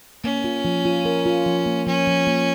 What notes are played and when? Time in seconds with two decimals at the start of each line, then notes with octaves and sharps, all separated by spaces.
0.24 A#3 C#4
0.44 F4
0.65 F3
0.85 F4
1.05 A#4
1.26 F4
1.46 F3
1.66 A#3
1.87 F3 C#4
2.07 F3
2.27 A#3